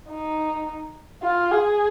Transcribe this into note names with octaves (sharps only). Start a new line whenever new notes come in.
D#4
F4
G#4